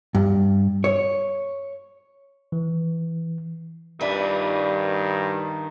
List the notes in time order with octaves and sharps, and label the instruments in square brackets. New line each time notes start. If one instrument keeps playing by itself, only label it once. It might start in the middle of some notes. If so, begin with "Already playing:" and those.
[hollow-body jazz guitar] G2
C#5
[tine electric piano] E3
[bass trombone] G2 [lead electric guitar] D#3 E5 [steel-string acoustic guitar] B4 D5